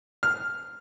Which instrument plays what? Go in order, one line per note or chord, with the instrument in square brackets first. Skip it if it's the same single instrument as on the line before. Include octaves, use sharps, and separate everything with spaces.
[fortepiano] F6